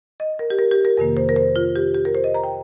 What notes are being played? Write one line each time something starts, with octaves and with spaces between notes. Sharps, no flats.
D#5
A#4
G4
A#4
G4
A#4
F2 C3 D#3 A#3 A#4
C5
A#4
C5
F4
G4
G4
A#4
C5
D#5
A#5
G5